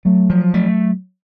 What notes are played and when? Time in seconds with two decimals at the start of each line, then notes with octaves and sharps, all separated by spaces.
0.05 F#3 A3
0.30 F3
0.54 A3